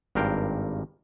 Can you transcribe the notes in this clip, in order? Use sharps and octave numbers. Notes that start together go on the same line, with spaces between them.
G#1 G2 A#4 F5 G5